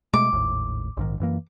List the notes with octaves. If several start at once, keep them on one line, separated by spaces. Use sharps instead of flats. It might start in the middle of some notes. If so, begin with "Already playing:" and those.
B2 G#3 A3 D6
G#1 D#2 A2
A#1 G#2 D#3
F#2 E3 A#3